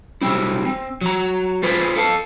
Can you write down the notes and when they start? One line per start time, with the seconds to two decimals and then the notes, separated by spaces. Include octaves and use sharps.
0.21 F#3 G3 C4 E4
0.65 C4
1.01 F#3 A#5
1.63 F4 G#4 B4 C5
1.96 A4 F5 A5